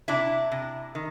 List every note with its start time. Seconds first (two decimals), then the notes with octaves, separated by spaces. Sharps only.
0.08 C3 D4 E4
0.52 C3
0.95 D#3